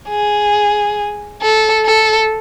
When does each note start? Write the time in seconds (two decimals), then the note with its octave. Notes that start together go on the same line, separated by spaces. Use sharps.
0.09 G#4
1.42 A4
1.85 A4